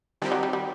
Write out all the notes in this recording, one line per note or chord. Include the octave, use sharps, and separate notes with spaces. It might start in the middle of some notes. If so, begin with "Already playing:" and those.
D#3 F3 G3 C4 D#4 G4
F#3
G3
G3